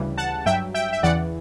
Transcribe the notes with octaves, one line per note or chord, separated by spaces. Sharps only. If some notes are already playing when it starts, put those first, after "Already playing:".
Already playing: D2 C#3 E3 G3
F#5 A5
G2 F#3 E5 G5
E5 G5
E5
E2 C#3 E3 D5 F#5